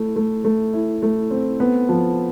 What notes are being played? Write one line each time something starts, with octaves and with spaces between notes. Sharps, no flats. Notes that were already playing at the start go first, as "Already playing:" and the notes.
Already playing: A3 E4
A3
A3
E4
A3
C4
B3
F3